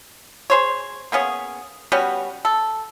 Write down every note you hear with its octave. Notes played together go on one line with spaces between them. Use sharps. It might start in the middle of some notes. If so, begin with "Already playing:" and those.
G#4 C5 C#5
A#3 B3 C#4 G#4
G3 B3 C#4 F#4
A4